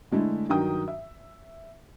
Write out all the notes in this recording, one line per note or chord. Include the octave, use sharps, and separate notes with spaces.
D3 G#3 A3 E4
G2 D#3 F#3 G5 D#6
E5